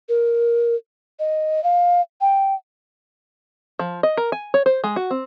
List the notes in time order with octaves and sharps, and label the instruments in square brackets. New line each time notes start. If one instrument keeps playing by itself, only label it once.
[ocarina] A#4
D#5
F5
G5
[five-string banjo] F3
D#5
A#4
G#5
C#5
C5
G#3
F#4
C4